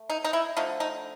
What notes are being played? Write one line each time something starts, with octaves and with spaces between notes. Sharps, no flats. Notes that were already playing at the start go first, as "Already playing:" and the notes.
Already playing: A3
D#4
D#4
E4
D3 F3 A3 D#4
D#4